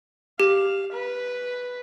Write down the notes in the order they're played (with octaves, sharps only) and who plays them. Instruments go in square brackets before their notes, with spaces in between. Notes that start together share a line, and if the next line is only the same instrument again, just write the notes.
[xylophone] G4 [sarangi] F5
[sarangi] B4